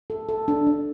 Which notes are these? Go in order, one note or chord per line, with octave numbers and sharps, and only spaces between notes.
A4
A4
D4
D4